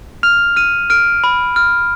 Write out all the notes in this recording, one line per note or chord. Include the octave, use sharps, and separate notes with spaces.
F6 F7
F6 D#7
F6 D7
B5
F6